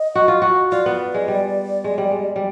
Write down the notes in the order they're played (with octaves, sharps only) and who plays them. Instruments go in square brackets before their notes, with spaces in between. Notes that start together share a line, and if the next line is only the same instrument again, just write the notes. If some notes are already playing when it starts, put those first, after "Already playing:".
Already playing: [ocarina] D#5
[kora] F#4
F4
F#4
[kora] F4 [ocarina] D5
[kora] B3
G#3
G3
G#3
G3
G#3
G3